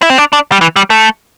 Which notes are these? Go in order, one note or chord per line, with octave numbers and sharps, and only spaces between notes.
E4
C4
D4
D4
G3
E3
G3
A3